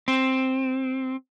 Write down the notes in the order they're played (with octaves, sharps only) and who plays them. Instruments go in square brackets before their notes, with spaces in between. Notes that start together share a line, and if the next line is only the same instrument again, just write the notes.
[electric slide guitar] C4